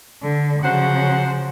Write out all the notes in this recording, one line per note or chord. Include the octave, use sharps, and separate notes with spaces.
D3
C#3 F3 F#3 C5 F#5